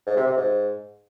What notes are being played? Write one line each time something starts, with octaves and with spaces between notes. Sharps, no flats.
G#2
C3
C3
G#2